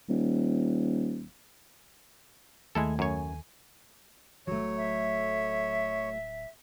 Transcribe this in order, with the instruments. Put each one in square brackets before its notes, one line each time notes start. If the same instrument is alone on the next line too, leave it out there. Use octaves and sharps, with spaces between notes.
[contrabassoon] D#1
[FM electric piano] D#2 A3 G#5 [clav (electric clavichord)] G#3 E4 A4
[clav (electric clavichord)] F#2 C#5
[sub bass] D1 [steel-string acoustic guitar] F#3 A3 [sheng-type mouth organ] C#5
[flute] E5